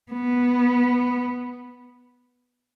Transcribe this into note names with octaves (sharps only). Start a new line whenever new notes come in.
B3